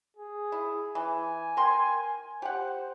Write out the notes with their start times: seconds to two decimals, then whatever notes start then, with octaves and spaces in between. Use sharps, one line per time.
0.17 G#4
0.52 E4
0.95 E3 G#5
1.57 A#4 G5 C6
2.42 G4 C5 F#5